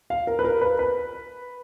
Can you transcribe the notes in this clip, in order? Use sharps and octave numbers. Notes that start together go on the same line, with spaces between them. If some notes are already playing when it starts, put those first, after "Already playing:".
F5
A#4
B4
A#4
B4
B4